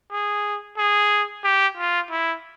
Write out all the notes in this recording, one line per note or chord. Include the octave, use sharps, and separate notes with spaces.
G#4
G#4
G4
F4
E4